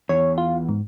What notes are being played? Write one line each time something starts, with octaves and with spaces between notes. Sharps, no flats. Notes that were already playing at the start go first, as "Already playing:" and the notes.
E2 C#5
F4
G#2